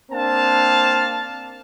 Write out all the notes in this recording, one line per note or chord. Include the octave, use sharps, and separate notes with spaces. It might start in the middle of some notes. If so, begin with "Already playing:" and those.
A#3 C4 D4 F5 A5